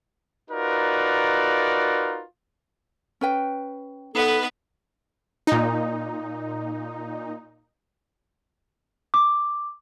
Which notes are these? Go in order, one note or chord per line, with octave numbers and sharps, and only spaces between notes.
D#4 F4 F#4 A#4 B4 D5
C#4 B4 G5
B3 D#4 A4 B4 F#5
A#2 D#4
D6